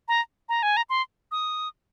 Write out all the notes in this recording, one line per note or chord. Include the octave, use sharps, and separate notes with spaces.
A#5
A#5
G#5
A#5
C6
D#6